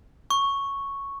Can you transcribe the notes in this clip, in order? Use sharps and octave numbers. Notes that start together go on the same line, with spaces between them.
C#6